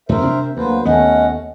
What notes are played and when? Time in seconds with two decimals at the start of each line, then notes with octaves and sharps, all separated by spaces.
0.09 F#2 A2 A#4 C5 E5
0.21 C3 C4 D4
0.57 D2 F#3 A#3 B4 C5
0.85 D#2 A3 B3 C#4 D#5 F#5